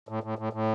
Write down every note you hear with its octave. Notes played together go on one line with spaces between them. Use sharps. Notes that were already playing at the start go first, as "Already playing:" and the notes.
A2
A2
A2
A2